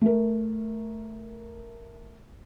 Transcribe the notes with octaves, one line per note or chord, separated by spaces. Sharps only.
A3 A#4